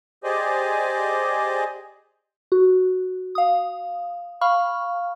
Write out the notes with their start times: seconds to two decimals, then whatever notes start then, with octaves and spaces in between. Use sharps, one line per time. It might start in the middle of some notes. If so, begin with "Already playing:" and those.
0.24 G4 G#4 C5 D5 D#5 G#5
2.52 F#4
3.35 F5 D#6
4.41 F5 B5 C#6 F6